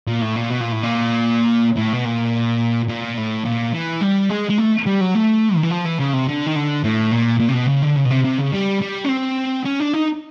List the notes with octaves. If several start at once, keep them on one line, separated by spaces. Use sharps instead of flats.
A#2
A2
A#2
B2
A#2
A2
A#2
A2
B2
A#2
A#2
A2
A#2
E3
G3
G#3
G#3
A3
G3
F#3
A3
D#3
E3
F3
E3
C#3
C3
D3
D#3
D3
A2
A#2
A#2
C3
B2
C#3
D3
C#3
B2
C3
C3
C#3
G3
G3
C#4
C4
C#4
D4
D#4